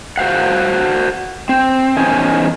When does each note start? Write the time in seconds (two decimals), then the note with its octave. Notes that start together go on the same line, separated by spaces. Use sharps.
0.17 F#4 C5 F5 F#5
1.49 C4
1.97 E2 C#4 D#4 C5 G#5